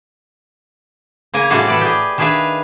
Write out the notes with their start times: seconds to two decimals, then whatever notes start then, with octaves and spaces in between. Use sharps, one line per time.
1.34 C#3 A#3 A#4 G#5
1.50 A2 C3 G3 F#4 G#4 A4
1.68 A4 B4 D5
1.81 G4 G#4
2.18 D#3 D4 G#4 B4 E5 F5